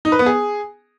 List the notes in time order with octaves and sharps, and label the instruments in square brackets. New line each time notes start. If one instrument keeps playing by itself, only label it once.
[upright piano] D#4
B4
B3
G#4